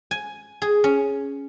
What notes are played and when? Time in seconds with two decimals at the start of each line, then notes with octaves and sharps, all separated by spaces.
0.11 G#5
0.62 G#4
0.84 C#4